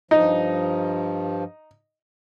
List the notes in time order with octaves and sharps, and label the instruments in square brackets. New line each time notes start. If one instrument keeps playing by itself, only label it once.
[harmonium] G2 F3 [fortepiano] D#4